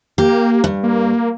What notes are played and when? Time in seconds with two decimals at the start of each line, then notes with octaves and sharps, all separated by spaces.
0.18 A#3 G4
0.64 G2
0.84 A#3